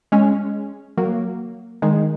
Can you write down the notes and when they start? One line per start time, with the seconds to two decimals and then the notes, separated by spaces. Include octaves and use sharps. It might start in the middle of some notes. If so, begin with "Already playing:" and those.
0.12 G#3 C#4
0.97 F#3 A#3
1.82 D#3 G#3